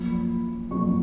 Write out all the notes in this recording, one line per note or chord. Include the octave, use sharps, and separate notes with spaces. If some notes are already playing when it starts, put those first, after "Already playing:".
Already playing: F#2 F3 A#3 B5
F#2 F3 A#3 C#6